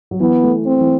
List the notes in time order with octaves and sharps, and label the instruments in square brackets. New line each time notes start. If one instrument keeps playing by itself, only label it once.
[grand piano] F#3
[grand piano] E3 [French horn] B3
[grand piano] A3
[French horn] C4
[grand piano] E3